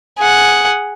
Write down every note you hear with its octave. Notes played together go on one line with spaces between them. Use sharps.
G#4 F#5